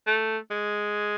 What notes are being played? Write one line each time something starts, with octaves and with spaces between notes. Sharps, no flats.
A3
G#3